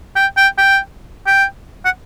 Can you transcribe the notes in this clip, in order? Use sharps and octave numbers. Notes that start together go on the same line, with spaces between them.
G5
G5
G5
G5
F#5